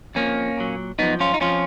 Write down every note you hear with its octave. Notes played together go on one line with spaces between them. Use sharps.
F2 F3 A#3 C#4
A#2 F#3
F#2 F3 B3 D#4
C#4 F4
D#4
F2 F3 C#4 F4